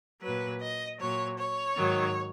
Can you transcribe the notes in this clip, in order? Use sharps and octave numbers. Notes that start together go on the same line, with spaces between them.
A#2 F#3 B4
D#5
A#2 F#3 C#5
C#5
G#2 D#3 F#3